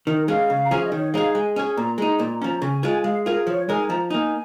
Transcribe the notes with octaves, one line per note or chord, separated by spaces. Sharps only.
D#3 A#4
G#3 C#4 F5
C#3
A#5
F3 C#4 G#4 G#5
F5
D#5
D#3 C#5
G#3 D#4 G#4 F5
G#3 G#5
C#4 G#4 G#5
A#2 A#5
G#3 D#4 A#5
A#2 A#5
F3 C#4 A#5
C#3 G#5
G#3 F4 G#4 G#5
G#3 F5
F4 G#4 A#4
A#4
F3 C#5
G#3 D#4 A#4 G#5
F3 A#5
A#3 D#4 G#5